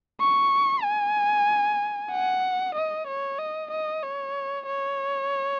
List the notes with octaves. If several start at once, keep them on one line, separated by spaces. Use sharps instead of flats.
C#6
G#5
F#5
D#5
C#5
D#5
D#5
C#5
C#5